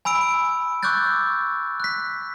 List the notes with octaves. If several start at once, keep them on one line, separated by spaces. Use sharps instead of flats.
G#5 B5 E6 D7
C#6 D6 E6 F#6 G6 A6
F#6 B6